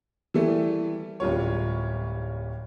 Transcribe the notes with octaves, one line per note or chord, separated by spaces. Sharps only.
E3 G3 A3
D1 G3 F4 C#5